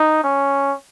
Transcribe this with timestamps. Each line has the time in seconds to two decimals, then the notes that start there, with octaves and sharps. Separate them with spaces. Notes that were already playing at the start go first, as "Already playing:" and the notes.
Already playing: D#4
0.24 C#4